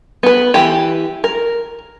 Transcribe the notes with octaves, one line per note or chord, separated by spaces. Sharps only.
B3 B4
E3 G4
A#4